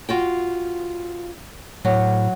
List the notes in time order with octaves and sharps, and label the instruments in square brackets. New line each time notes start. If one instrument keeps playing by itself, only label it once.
[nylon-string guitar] F4 F#4 G5
[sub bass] A2 [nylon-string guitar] F#3